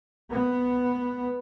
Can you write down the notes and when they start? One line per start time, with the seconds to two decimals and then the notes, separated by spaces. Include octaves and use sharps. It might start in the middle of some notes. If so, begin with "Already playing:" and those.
0.31 B3